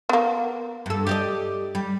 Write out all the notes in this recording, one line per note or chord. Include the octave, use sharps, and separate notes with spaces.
A#3 B3
G2 A4
G4 D5 D#5
G3